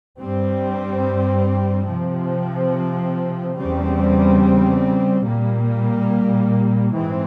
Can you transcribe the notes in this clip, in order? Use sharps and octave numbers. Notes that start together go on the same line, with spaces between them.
G2 G3 C4
C3 F3 C4
E2 C#3 G3 C4
A#2 G3 A#3
G#2 E3 G#3 C4